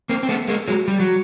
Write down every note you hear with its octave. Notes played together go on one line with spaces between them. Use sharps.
A#3 C4
C4
A3 B3
G#3 A#3
F#3 G#3
G3
F#3